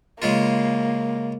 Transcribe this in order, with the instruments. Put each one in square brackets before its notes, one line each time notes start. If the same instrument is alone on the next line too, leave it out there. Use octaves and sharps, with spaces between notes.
[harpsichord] C#3 G#3 F4 [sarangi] A#3